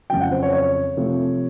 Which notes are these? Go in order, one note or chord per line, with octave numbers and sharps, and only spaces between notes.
F2 C#3 F#3 G5
F#5
C5
C#5
C#5
C3 F3 A3 C4